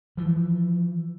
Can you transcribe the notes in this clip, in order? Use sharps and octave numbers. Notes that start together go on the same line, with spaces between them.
E3 F3